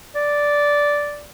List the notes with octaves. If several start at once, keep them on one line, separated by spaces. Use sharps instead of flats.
D5